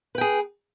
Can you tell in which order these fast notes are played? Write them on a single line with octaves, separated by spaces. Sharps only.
B4 G5 G#4